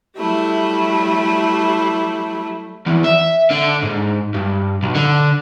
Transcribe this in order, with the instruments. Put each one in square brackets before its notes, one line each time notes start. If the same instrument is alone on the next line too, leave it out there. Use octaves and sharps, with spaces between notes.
[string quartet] F#3 G3 A3 E4
[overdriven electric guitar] E2
E5
D3
G#2
G2
B1
D3